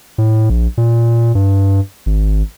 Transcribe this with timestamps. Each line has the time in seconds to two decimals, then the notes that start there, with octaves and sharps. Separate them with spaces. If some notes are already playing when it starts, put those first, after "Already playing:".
0.18 A2
0.50 A#1
0.78 A#2
1.35 G2
2.06 G#1